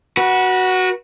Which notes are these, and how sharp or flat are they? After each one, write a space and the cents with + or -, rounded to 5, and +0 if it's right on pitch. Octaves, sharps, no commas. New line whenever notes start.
F#4 +5 B4 -30